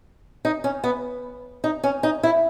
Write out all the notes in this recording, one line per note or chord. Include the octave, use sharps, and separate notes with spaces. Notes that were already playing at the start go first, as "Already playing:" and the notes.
D#4
C#4
B3
D#4
C#4
D#4
E4